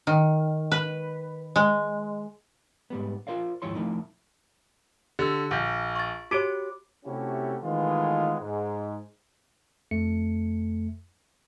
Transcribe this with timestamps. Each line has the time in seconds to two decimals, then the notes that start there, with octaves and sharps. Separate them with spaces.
0.07 D#3
0.72 B4
1.56 G#3
2.90 G#2 G3 B3
3.27 F4 A#4 C5 D5 F5
3.62 D#2 G#2 F3 E4 C#5 C6
3.75 F3 A3 A#3 D#4 E4
5.19 D3 G4 E6
5.51 A#1 F#5 G6
5.96 C#6 A6
6.31 F#4 G4 C#5 D6 D7
7.06 C3 A3 C#4 E4 F#4 G4
7.63 D#3 E3 G#3 A3 B3 F4
8.41 G#2
9.91 F2 A3 C#7